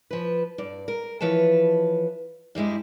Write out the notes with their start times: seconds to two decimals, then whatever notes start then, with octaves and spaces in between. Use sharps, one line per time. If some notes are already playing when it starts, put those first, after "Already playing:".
0.11 F3 B4
0.58 G2 D5
0.88 A#4
1.21 E3 F3 B4 C#5 A5
2.55 G2 G3 G#3 E4